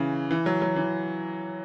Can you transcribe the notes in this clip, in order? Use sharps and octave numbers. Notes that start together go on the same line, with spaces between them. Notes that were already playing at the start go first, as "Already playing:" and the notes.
Already playing: C#3 E3
E3
F#3
F#3
E3